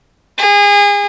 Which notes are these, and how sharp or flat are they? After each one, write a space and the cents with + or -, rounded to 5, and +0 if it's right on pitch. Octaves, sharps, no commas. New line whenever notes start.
G#4 -30